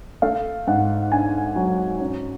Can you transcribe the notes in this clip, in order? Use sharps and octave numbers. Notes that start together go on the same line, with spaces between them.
A3 F5
G#2 F#5
D4 G#5
F#3
C#4